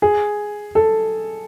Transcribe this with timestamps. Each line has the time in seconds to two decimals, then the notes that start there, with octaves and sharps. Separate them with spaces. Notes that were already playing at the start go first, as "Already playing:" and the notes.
0.02 G#4
0.75 A4